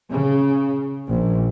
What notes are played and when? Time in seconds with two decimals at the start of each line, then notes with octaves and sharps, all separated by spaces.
0.14 C#3
1.10 A#1